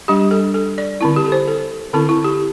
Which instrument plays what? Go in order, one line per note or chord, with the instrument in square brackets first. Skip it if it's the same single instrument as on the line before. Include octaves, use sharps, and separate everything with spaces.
[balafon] G3 D4 G4
A4
A4
D5
D3 C4 E4
G4
A4
C5
A4
D3 C4 E4 A4
E4
G4